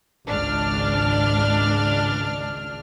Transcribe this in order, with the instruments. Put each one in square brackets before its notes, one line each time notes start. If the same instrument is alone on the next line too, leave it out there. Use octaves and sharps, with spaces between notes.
[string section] G#1 C#2 D4 F6